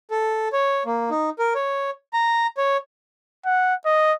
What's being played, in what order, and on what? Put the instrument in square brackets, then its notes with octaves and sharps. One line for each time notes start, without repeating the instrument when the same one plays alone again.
[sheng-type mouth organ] A4
C#5
A#3
D#4
A#4
C#5
A#5
C#5
[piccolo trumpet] F#5
D#5